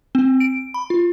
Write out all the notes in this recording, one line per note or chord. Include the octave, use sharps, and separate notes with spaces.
C4
D7
B5
F4